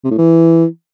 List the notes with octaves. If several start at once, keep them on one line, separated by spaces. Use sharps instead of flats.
C3
A2
E3